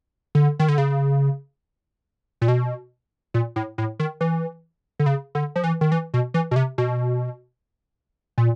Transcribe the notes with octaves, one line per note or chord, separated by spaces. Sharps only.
D3
D#3
D3
C#3
A#2
B2
A#2
A2
A2
D#3
E3
D3
C#3
D3
F3
E3
D#3
E3
B2
E3
B2
C3
B2
A#2